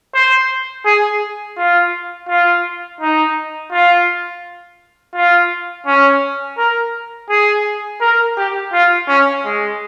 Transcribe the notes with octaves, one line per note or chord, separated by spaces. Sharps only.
C5
G#4
F4
F4
D#4
F4
F4
C#4
A#4
G#4
A#4
G4
F4
C#4
G#3